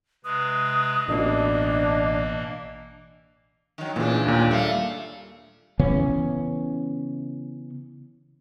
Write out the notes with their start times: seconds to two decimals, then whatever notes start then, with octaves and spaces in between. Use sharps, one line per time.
0.24 C3 G#3 B4 D#6
1.08 A1 B2 E3 A#3 D4 D#5
3.78 D#3 F#3
3.96 A#2 C#3 E3 D4 G#4
4.26 D#2 A#2
4.51 G3 A3 F5
5.79 C#3 E3 B3 C#4